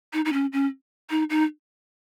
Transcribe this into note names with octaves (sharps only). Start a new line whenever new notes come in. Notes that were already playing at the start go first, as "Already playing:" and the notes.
D#4
D#4
C#4
C#4
D#4
D#4